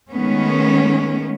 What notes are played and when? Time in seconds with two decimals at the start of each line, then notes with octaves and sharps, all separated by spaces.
0.12 D#3 G#3 A3 B3 C#4